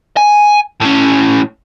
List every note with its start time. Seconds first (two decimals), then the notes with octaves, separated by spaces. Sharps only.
0.17 G#5
0.81 A2 C#4